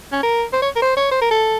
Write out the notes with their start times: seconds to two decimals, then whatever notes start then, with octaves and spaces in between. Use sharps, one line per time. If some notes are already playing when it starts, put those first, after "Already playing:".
0.12 C#4
0.23 A#4
0.53 C5
0.62 C#5
0.76 A#4
0.82 C5
0.97 C#5
1.11 C5
1.21 A#4
1.31 A4